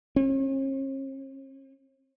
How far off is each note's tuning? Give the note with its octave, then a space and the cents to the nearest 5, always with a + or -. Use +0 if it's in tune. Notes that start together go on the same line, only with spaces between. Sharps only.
C#4 -45